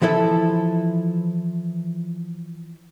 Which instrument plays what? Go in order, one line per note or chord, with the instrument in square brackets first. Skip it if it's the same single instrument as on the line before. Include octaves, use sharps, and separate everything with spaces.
[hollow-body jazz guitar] E3 F3 E4 A4 E5